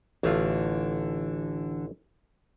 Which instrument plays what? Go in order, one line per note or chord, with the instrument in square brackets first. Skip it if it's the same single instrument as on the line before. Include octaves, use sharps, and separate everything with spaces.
[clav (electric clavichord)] A1 A3 F4 [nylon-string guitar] D3 E3